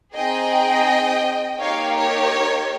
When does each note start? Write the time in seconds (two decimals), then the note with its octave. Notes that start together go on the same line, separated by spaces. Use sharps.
0.15 C4 D#4 G#4 D#5 G5
1.60 A#3 D#4 G4 C#5 F5
1.96 A#4 C#5